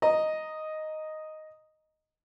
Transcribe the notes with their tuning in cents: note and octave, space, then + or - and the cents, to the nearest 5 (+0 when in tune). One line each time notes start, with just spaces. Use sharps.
D#5 +0 A#5 +0